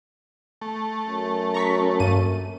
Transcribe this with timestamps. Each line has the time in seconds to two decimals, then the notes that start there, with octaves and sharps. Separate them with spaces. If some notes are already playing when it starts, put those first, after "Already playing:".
0.61 A3
1.07 F#2
1.54 A#5 C#6 B6
2.00 G2 A#3 D#7